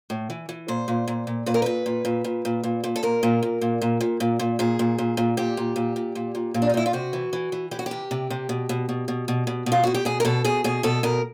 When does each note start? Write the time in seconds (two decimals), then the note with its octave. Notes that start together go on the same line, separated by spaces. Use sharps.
0.10 A2
0.30 E3
0.49 E3
0.68 A#2 C5
0.88 A#2
1.08 A#2
1.27 A#2
1.46 A#2 B4
1.54 A#4
1.62 A#2 B4
1.86 A#2
2.05 A#2
2.24 A#2
2.45 A#2
2.64 A#2
2.84 A#2
2.96 A4
3.03 A#2 A#4
3.23 A#2
3.43 A#2
3.62 A#2
3.81 A#2
4.01 A#2
4.20 A#2
4.39 A#2
4.59 A#2 G#4
4.79 A#2
4.98 A#2
5.17 A#2
5.37 A#2 G4
5.57 A#2
5.76 A#2
5.96 A#2
6.15 A#2
6.35 A#2
6.54 A#2
6.62 D4
6.69 D#4
6.74 A#2 E4
6.86 F4
6.93 C3 F#4
7.13 E3
7.33 E3
7.52 E3
7.71 E3 G4
7.79 F#4
7.86 G4
7.91 C3
8.11 C3
8.30 C3
8.49 B2
8.69 B2
8.89 B2
9.08 B2
9.28 B2
9.47 B2
9.66 B2
9.72 F4
9.84 B2 F#4
9.94 G4
10.05 B2 G#4
10.20 A#4
10.25 B2 A4
10.44 B2 G#4
10.64 B2 G#4
10.83 B2 A4
11.03 B2 A#4